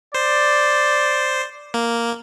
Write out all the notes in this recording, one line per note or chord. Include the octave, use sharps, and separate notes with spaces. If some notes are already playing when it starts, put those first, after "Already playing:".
C5 D5
A#3